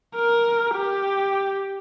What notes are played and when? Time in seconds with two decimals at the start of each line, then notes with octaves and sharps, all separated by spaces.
0.15 A#4
0.74 G4